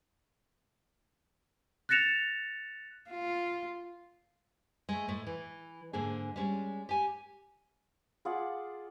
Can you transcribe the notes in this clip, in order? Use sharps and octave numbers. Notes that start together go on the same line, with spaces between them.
F#6 A6 A#6 C#7 E7 F7
F4
G#3 A3
A2 A3
E3
G#2 D3 A#3 G#4
G3 G#3 C#4
G4 G#5
F4 G#4 D5 F#5